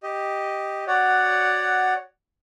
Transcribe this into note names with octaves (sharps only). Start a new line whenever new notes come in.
G4 D#5
F#4 C#5 D5 F#5